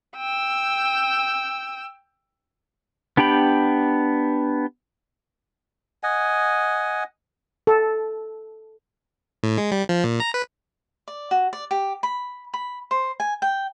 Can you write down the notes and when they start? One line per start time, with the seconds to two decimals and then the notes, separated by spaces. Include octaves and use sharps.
0.16 G5 E6
3.17 B3 D4 G4 G5 B5
6.03 D#5 F#5 G#5
7.67 A4
9.43 A2
9.58 G#3
9.71 G3
9.89 F3
10.04 A#2
10.20 A#5
10.34 B4
11.08 D5
11.31 F#4
11.53 D5
11.71 G4
12.03 B5
12.54 B5
12.91 C5
13.20 G#5
13.42 G5